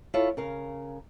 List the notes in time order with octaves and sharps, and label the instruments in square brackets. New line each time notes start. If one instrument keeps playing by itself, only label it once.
[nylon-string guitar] E4 F4 A4 C#5 F5
C#3 A#4 F5